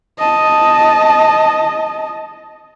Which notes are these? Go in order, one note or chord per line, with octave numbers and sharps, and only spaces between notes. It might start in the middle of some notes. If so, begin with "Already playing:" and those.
D#5 A5